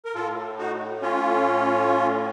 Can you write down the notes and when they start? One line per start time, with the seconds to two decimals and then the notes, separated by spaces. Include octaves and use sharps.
0.05 A#4
0.15 A2 F4 A4
0.58 D#4 F#4
1.02 C#4 F4